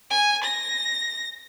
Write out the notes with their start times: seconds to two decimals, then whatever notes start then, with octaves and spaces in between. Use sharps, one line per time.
0.10 G#5
0.44 A#6